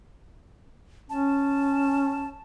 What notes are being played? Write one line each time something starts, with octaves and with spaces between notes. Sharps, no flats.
C#4 A5